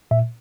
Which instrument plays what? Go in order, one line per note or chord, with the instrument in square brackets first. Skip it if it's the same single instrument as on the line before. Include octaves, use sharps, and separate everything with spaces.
[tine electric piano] A#2 E5